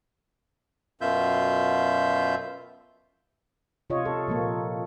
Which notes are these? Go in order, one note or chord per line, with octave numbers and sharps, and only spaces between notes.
F#2 B2 F4 E5 G6
C3 F4 C#5 D#5
A4
A#2 F3 A#3